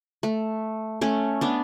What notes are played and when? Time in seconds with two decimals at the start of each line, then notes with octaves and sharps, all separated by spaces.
0.23 A3
1.01 A3 C#4
1.41 B3 D4